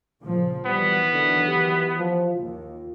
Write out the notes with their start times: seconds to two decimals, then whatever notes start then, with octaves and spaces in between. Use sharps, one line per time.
0.22 A#2 C#3 F3
0.66 D#3 E3 F#3 G3 B3
1.12 D3
1.48 G4
1.97 F3
2.35 D#2 F4